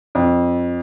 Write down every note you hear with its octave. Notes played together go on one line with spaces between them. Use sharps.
F2